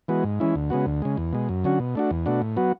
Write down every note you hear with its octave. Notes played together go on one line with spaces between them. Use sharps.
E3 G#3 B3 F#4
G#2
E3 G#3 C#4 E4
D2
C#3 G#3 B3 F#4
D2
C#3 G#3
E2
B2 G#3
F#2
D3 F#3 C#4 F#4
B2
A3 D4 F#4
E2
B2 A3 D4 F#4
A2
F#3 B3 F#4